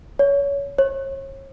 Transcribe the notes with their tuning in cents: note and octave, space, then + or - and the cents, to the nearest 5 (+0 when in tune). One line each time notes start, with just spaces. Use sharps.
C#5 +25
C#5 -35